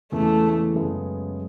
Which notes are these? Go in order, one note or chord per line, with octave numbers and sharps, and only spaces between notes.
E2 C#3 E3 G#3 A3
F#2 C#3 G#3 B3